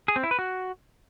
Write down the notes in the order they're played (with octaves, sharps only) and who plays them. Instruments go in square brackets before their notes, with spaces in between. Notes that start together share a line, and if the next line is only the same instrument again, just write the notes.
[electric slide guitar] G#4
C4
E4
B4
F#4